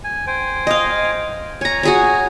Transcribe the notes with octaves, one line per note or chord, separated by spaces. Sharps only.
G#5
C5 G5 G#5
D#5 F5
C#5 G#5 A#5
F#4 G#4 C#5